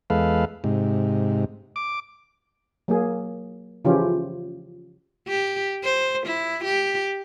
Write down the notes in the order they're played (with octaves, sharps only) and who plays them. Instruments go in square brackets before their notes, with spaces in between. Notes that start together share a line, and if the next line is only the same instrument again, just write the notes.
[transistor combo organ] E2 G#3 A4 B4 F5
G#2 C3
D6
[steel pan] F#3 A#3 G#4
C#3 E3 F3 C#4 F4 G4
[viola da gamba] G4
C5
E4
G4